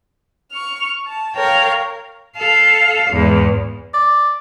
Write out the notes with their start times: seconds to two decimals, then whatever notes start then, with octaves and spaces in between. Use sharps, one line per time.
0.51 C#6 F6
1.06 A5
1.35 A#4 C#5 F5 G5
2.37 A4 F5
3.11 E2 G#2
3.94 D5